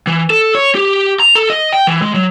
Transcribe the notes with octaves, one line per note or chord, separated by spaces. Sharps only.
E3
A4
C#5
G4
A#5
A4
D#5
G5
E3
G#3
F#3